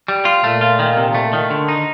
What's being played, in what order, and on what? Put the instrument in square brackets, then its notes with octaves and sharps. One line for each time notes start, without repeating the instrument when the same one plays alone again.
[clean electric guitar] G3
F4
[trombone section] A#2 [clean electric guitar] A3
[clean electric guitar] F4
D#3
C3
A3
D#3
D3
D#4